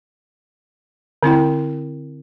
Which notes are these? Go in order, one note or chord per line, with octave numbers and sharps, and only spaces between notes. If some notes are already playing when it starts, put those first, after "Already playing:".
D3 C4 E4 G5